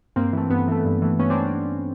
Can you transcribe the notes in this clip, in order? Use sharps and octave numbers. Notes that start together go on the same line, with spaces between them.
G2 A#3 C4
E3 A3
G2 B3
E3 A3
G2
E3 A3
G2 B3 C#4
C4 D4